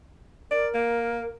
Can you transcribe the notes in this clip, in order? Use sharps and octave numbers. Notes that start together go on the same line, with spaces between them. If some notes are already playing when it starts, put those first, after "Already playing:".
A#4 D5
A#3